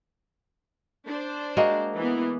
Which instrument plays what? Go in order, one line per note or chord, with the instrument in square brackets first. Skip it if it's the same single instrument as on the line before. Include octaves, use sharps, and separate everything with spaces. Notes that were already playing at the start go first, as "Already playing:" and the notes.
[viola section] D4 C5
[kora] G#3 A#3 F#4
[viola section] E3 B3